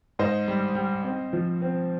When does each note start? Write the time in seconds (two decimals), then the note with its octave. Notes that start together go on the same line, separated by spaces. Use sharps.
0.19 G#2 C5 D#5
0.48 G3
0.75 G3
1.04 C4
1.33 F3
1.61 C4